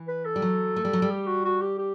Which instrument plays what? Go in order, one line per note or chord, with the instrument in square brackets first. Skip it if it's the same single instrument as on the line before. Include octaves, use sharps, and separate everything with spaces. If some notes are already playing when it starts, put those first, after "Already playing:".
Already playing: [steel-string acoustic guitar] E3
[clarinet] B4
A4
[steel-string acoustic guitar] G3
F#3
A3
G3
F#3
G3
[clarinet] G4
F#4
F#4
G4
G4